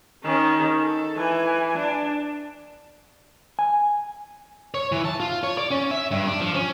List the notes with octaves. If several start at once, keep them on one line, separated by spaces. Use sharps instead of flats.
D#3 C#4
A4
E3 G#5
D4
G#5
C#5
E3
A5
F4
C#5
D5
C#4
E5
G2
D4
F3
C#4